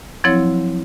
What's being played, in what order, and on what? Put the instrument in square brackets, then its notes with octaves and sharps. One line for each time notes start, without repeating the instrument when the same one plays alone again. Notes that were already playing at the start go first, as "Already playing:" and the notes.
[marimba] F3 F#3 C4 E4 C#5